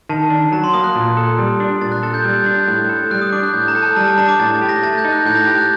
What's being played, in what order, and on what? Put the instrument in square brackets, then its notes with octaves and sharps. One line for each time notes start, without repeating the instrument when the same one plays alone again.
[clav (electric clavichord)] D#3 [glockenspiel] A5
[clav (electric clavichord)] D4
[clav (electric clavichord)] F#3 [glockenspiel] A#5
[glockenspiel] C6
[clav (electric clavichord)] A#3 [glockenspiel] D#6
[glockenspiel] F#6
[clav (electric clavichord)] A#2
A4
G3
D4
[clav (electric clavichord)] A#2 [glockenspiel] A6
[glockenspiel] F#6
[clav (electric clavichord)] A4 [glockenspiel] A6
[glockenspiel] G6
[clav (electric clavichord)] G3
D4
[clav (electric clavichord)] A2 [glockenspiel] F#6
[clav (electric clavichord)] A4
[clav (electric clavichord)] G3 [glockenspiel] F#6
[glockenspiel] D#6
[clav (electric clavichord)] D4 [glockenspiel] D6
[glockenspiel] F#6
[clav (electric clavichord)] A2 [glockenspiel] G6
[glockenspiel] A#5
[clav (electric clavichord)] A4
[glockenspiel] A5
[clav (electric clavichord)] G3 [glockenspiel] A#5
[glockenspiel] A5
[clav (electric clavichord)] D4 [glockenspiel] A#5
[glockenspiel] D6
[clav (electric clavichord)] A2 [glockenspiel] A6
[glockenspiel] A6
[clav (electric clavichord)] G4
[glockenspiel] A#6
[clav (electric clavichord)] A3 [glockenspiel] A6
[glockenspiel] G6
[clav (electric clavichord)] D#4
[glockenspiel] F#6
[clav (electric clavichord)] A2 [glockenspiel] G6
[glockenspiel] A#6
[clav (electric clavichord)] G4 [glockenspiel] A6
[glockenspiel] F#6